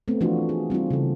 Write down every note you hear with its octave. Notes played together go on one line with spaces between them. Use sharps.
A3 B3 C4
E3 F3 A3 D4 F4 F#4
G#4
G3 C4 D#4 F4
C#3 E3 A4